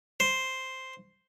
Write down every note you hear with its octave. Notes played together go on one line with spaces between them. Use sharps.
C5